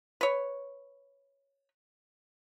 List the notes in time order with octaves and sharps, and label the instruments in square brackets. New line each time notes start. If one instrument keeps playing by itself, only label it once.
[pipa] B4 C#5